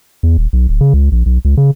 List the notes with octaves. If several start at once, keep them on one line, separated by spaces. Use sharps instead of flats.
E2
D#1
B1
D1
C#3
C#2
A#1
B1
C#2
C#3